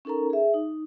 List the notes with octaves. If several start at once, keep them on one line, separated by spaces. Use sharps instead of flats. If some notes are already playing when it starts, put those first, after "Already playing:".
C#4 D#4 A4 A#4 A#5
G#4 E5
D#4